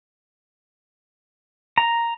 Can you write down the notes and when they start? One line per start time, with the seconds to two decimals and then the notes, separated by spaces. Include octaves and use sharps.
1.78 A#5